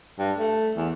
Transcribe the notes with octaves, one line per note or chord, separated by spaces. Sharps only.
G2
A3
E2